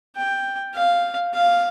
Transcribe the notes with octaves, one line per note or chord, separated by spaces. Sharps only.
G5
F5
F5